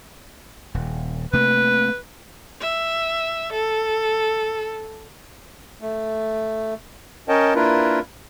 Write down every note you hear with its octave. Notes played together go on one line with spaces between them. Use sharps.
D#1
C3 A3 A#3 B4
E5
A4
A3
C#4 A#4 C#5 D#5 G5 A5
A#3 D4 E4 F4 A#4 B4